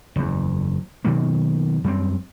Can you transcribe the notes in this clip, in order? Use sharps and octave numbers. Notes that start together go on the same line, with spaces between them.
F#1 E2
B2 D#3 F#3 A#3
F#2 G3 C4